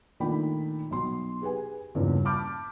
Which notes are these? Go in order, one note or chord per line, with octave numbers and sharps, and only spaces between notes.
A#2 D#3 A3 D4 G5 B5
B1 C6
G4 G#4 B4 G#5
E2 G2 A#2 C#3
A5 B5 D6 F6 G6